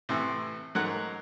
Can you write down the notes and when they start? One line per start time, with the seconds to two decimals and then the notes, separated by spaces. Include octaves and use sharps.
0.09 A2 C3 E3
0.75 G#2 F#3 A3 A#4 F#5 F#6